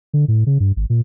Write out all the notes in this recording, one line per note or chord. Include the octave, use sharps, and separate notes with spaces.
D3
A2
C#3
G2
G#1
A#2